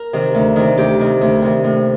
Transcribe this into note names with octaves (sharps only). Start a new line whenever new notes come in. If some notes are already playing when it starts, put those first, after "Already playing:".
Already playing: A#4
C3 D#3
D2
C3 D#3
D2 G4
C3 D#3
D2
C3 D#3
A2